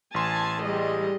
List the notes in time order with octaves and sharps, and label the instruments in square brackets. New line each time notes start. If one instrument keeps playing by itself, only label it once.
[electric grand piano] A1 C6 [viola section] G#5 A5
[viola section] G3 G#3 D#5